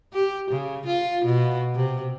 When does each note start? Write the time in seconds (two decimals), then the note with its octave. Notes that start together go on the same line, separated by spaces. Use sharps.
0.14 G4
0.51 C#3
0.86 F4
1.25 B2
1.75 C3